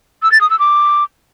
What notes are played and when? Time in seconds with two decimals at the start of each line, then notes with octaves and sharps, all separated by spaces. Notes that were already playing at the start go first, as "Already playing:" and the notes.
0.23 E6
0.32 A6
0.41 D#6
0.50 E6
0.59 D6